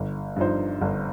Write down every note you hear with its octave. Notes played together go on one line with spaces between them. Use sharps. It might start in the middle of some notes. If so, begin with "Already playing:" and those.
Already playing: G1
G2 F3 D#4 C5
G1